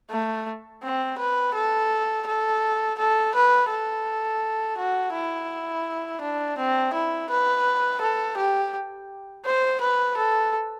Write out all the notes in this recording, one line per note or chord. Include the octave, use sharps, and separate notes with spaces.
A3
C4
B4
A4
A4
A4
B4
A4
F#4
E4
D4
C4
E4
B4
A4
G4
C5
B4
A4